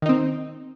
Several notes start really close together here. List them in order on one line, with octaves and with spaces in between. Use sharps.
D#3 D#4 C4